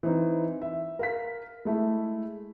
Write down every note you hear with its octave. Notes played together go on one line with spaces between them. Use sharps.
E3 C4 D#4
E5
A#4 F5 B6
G#3 A3 E4